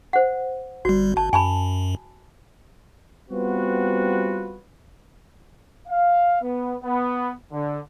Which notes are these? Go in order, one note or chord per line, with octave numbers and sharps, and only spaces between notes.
C5 F#5
G1 G3 F#4
G1 A5
F#2 G#5 A5 B5
G3 B3 C4 F4 F#4 B4
F5
B3
B3
D3